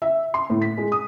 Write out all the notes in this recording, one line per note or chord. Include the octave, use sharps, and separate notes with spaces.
E5
C6
A2
B6
G#3
D#6